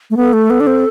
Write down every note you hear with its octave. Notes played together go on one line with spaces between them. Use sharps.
A3
B3 A4
A3
B3
D4
C4